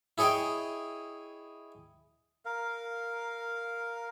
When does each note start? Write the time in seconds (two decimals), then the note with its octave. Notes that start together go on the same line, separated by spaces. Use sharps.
0.18 E4 G#4 C#5 D#5 G5
2.45 A#4 F5